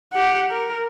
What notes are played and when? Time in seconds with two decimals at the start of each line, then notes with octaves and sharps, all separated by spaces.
0.12 G4 F#5
0.51 A#4